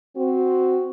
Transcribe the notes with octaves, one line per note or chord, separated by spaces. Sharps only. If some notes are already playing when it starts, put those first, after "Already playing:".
C4 F#4